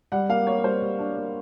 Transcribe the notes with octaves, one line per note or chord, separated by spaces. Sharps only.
G3 F#5
A#3 F5
A#3 C#5
G3 C5
G3
D4
A#3